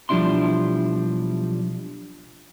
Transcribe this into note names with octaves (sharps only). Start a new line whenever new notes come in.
B1 F3 G3 D4 E4 C6